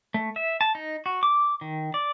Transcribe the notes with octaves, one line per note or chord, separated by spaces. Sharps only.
A3
E5
A5
D#4
F#4
D6
D#3
D5